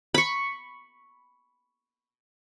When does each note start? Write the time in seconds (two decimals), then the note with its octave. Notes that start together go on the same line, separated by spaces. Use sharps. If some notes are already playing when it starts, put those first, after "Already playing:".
0.14 B5 C#6